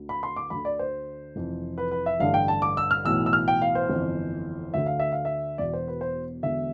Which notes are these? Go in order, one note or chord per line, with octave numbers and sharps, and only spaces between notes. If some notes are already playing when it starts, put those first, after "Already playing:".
Already playing: D2 D3
B5
C6
D6
D2 D3 B5
D5
C5
F1 F2 E3
B4
B4
E5
A1 G2 D3 F5
G5
A5
D6
E6
F6
B1 A2 E3 E6
E6
F6
G5
F5
C5
G1 F2 E3
D2 D3 E5
F5
E5
F5
E5
E1 E2 B2 D5
C5
B4
C5
E1 E2 D3 E5